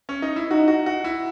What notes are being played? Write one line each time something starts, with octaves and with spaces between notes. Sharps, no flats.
C#4
D#4
E4
D#4 F#4
F#4
F#4
E4